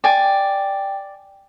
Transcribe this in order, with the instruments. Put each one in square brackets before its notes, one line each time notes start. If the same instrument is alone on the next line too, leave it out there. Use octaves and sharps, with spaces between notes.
[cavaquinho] D5 G#5 [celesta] G5